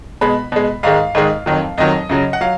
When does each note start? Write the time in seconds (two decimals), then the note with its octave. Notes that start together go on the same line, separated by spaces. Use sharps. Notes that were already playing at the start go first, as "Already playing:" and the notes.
0.21 B2 G#3 B5
0.52 B2 G#3
0.83 G#2 D#3 G#3 F5
1.15 G#2 D#3 G#3
1.46 F2 D#3 F#3
1.78 F2 D#3 F#3 D#5
2.09 F#2 C#3 F#3
2.33 F#5
2.41 F#3 F5